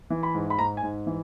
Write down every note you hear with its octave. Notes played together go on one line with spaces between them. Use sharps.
E3
B5
G#2
B5
G#2 A#5
G#5
G#2
E3